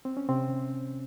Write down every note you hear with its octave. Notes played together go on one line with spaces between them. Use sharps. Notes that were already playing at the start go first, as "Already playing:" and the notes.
C4
C#4
C3 C4